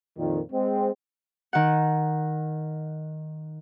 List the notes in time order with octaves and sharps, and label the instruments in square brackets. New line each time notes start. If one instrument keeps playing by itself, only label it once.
[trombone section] F2 A#2 D#3
G#3 C4
[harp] D#3 F#5